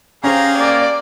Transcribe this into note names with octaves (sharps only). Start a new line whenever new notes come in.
C#4 G4 G#4 C5 F5 A#5
A#3 D5